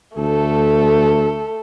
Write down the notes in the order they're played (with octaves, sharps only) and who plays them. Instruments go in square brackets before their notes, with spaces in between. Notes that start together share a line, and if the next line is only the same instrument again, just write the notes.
[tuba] D2 [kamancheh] A3 A4